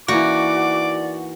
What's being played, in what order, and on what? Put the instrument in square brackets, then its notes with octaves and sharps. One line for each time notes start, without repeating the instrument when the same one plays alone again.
[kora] E3 A#3 D#4 [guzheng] F#4 [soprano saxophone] D5 [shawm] D6